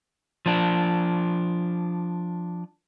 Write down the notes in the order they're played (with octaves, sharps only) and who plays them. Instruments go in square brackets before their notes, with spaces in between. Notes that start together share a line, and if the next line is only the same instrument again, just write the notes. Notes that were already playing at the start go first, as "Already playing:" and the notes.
[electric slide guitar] F3 D4